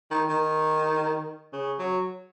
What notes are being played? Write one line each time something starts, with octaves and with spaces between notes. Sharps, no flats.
D#3
D#3
C#3
F#3